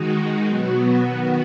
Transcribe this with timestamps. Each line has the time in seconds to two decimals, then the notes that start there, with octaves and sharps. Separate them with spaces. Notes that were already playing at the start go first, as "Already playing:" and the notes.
Already playing: D#3 G#3 D#4 F#4
0.47 B2 F#3 B3 F#4
1.06 D#3 B3 F#4